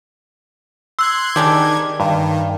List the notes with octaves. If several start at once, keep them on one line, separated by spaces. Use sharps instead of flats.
C6 E6 F#6 G#6
D#3 G#3 D4 G4 G#6
G2 D#3